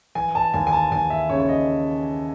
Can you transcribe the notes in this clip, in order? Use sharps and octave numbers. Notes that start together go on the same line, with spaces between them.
E3 G#5
A5
D#2 G#5
G#5
A5
D#2 G#5
E5
C#3 C#5
C#5
D#5